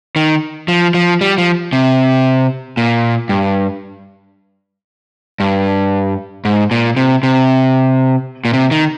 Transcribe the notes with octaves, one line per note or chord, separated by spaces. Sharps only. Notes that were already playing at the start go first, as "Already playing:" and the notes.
D#3
F3
F3
G3
F3
C3
A#2
G2
G2
G#2
A#2
C3
C3
A#2
C3
D#3